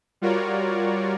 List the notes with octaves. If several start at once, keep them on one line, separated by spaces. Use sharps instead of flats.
G3 F4 F#4 A#4 C#5 D5